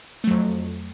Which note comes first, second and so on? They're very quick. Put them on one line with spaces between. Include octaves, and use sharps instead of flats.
A3 F#3 F2